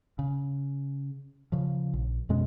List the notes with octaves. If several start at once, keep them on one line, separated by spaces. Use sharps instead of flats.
C#3
C#3 F3
A#1
F2 B2 G#3 C#4